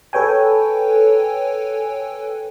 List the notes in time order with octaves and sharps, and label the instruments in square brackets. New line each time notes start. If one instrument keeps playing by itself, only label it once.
[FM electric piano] A4 B4 C#5 G5 G#5